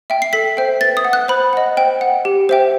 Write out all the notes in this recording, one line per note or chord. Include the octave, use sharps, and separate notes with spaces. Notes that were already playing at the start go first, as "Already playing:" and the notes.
E5 G5
C7
A4 B6
C5 E5 G5
B4 A6
D#6
F#5
F#6
C5 B5
D#5 F#5
C5 G5
F#5
G4
C5 E5 G5